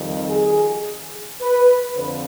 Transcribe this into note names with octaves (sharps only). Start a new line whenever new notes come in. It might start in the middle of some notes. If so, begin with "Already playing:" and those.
Already playing: F2 D#3 G3
G#4
B4
F2 D3 C5